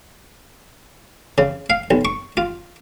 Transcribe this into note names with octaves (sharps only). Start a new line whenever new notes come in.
C#3
F5
B1
C#6
F4